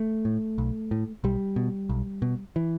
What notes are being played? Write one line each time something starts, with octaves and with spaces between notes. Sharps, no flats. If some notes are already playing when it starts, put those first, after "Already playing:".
Already playing: A3
A2
B1
A2
B1 G3
B2
B1
B2
E3